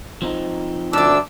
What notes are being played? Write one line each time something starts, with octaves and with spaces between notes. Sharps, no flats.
F3 C4 D#4
D2 G2 D4 D5 E6